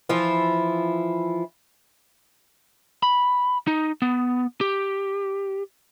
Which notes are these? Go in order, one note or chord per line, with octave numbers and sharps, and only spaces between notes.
E3 F3 E4 F4
B5
D#4
B3
G4